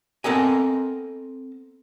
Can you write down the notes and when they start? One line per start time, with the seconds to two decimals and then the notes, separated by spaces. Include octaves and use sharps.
0.24 B3 C4 A4 A#4 D#5 G#5